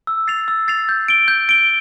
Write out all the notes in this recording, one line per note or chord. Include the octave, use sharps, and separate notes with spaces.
E6
A6 C7 F7
E6
A6 C7 F7
G6
D7 G7
G6
D7 G7